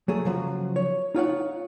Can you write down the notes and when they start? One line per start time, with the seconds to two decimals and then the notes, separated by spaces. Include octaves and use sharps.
0.08 F#3 A3 G#4
0.25 C#3 F3 F#3
0.76 C#5
1.15 D#4 F4 C#5 F#5